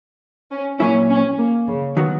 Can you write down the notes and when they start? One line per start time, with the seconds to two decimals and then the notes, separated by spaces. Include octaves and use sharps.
0.51 C#4
0.80 A#2 F#3 A#3 C#4 E4
1.09 C#4
1.38 A#3
1.68 C#3
1.97 D#3 F#3 B3 F#4